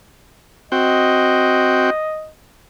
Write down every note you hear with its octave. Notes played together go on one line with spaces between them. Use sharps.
C4 F#4 D#5 G5